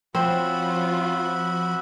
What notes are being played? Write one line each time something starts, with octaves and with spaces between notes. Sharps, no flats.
F3 C4 C#4 F4 F#4 E5 B5